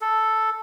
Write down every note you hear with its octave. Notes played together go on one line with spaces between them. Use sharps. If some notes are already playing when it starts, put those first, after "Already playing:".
A4